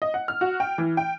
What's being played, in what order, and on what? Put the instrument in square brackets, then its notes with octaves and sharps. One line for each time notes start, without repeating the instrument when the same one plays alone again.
[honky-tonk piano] D#5
F#5
F6
F#4
G5
E3
G5